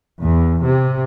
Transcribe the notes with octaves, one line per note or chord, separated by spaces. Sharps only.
E2
C3